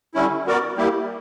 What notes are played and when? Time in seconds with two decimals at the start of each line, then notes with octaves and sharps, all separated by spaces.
0.14 D3 G3 C#4 E4
0.47 B3 F#4 A#4 D5
0.77 G3 A#3 E4 G4